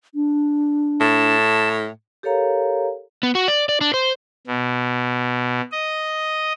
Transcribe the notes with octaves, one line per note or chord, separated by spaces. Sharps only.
D4
A2 A5
G4 A4 A#4 C#5 F5 A#5
B3
F#4
D5
D5
D4
C5
B2
D#5